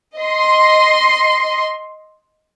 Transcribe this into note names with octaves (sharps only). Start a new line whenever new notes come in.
D#5 C6